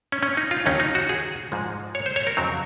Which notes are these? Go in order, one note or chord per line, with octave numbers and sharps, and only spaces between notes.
C#4
C#4
D#4
F4
D#2 C#3 F#3 C#4 D#4
D#4
F#4
G#4
G#2 F3 G#3
C#5
C5
C#5
A#4
F2 C#3 F#3 C4